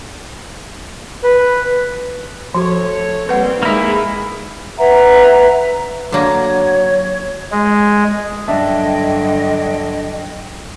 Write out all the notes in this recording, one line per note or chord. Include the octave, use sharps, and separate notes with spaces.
B4
F3 A3 F#4 C#5
G3 A#3 C4 B4 F#5
G#3 A#3 D#4 E4
B4 E5 F#5 A#5
D3 F#3 A#3 C#5
G#3
G2 D3 F#3 D4 D#5 E5 G5 A5